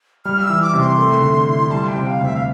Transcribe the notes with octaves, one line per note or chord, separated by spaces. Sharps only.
G3 F6
E6
E3
D6
C3
C6
A3
D3
E4
G3 A5
G5
C3
F5
D2
E5
F5